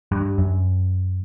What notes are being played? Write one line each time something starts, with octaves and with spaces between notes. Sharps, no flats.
G2
F#2